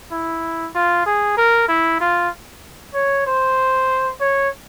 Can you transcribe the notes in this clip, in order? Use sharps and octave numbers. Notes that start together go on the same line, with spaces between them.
E4
F4
G#4
A#4
E4
F4
C#5
C5
C#5